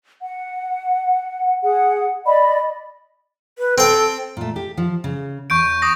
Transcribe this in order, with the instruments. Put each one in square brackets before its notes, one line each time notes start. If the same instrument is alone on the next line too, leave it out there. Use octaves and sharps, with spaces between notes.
[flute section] F#5
G#4 F#5
D5 D#5 B5
[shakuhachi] B4
[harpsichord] C4 G5 [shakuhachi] A4
[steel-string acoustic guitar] A#2 A3
G4
F3
C#3
[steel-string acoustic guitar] E2 [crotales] C#6 G6 D7
[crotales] D6 D#6 A#6